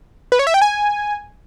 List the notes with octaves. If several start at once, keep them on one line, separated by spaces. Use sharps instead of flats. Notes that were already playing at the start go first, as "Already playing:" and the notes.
B4
C#5
E5
G5
G#5